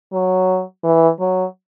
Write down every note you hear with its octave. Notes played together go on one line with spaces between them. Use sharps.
F#3
E3
F#3